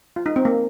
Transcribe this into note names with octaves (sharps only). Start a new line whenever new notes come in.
F4
D#4
C4
A#3